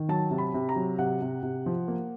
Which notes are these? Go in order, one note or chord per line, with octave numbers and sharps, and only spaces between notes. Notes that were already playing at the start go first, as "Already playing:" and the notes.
Already playing: D#3
F#3 A5
C3
B5
C3
A#5
F#3
C3 F#5
C3
C3
F3
A#3